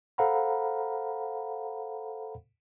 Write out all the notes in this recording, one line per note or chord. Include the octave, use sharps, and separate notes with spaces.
A4 C5 F5 F#5 A#5 B5